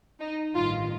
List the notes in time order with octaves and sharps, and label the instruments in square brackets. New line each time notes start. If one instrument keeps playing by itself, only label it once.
[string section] D#4
A1 G2 D#3 F4